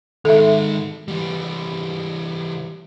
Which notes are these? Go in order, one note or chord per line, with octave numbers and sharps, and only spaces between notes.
D#3 G#3 A4 E5
E3 G3